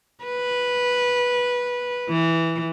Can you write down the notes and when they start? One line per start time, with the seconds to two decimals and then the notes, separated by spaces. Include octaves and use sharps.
0.24 B4
2.09 E3